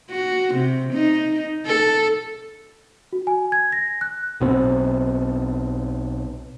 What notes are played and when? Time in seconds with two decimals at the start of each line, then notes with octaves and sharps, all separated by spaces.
0.10 F#4
0.54 C3
0.93 D#4
1.66 A4
3.13 F#4
3.27 G#5
3.52 G#6
3.72 A#6
4.01 F#6
4.40 B1 B2 C4